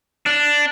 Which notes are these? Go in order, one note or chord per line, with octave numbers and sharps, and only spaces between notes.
D4